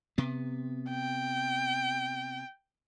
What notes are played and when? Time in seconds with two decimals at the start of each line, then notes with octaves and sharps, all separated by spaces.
0.18 C3 B3
0.90 G5